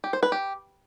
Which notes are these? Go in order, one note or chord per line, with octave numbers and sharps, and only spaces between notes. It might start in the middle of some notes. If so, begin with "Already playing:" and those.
G4
C5
B4
G4